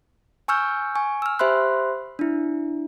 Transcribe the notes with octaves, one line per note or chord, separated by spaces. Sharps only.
G#5 C#6 E6 F6 G6
G#5 C#6
E6 F6
G4 C5 E5 B5 C6 F#6
D4 E4